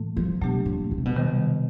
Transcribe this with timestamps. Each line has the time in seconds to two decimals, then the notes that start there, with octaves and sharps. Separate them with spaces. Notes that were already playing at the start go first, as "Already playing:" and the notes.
Already playing: A2 E3 A3
0.17 F3
0.41 B2 F#3 A3 D4 G4
0.66 A#2
0.91 B2
0.98 C3
1.05 B2
1.16 C3 D#3 G3